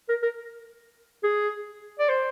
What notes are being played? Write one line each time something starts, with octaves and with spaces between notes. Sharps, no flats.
A#4
A#4
G#4
D5
C5